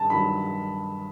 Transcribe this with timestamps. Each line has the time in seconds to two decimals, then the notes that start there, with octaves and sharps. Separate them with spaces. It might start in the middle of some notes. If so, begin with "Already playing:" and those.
Already playing: G2 D#3 A5
0.10 G2 D#3 F#3 B5